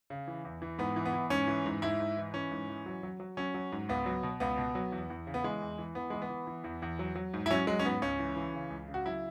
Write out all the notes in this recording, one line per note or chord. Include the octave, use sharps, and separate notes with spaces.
C#3
E3
E2
E3
G#2 B3
E3
B3
E3
G#2 C#4
E3
G#2
G#2 E4
G#2
E3
E3 C#4
G#2
E3
F#3
F#3
F#3
F#3 C#4
F#3
G#2
C#2 B3
F#3
B2
C#2 B3
B2
F#3
E2
E2
C#3
B3
E3 G#3
E2
E3
E3 B3
E3 G#3
B3
E3
E3
E2
E2
F#3
F#3
G#2
E4
F#3 C#4
F#3 G#3
C#4
G#2 B3
C#2 C#4
E3
E3
C#3
C#2
C#3
F#4
F#3 E4